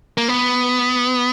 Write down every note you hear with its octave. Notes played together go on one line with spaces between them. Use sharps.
A#3
B3